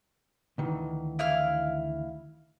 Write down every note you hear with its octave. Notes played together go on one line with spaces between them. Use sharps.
D2 D#3 E3
E4 F5 F6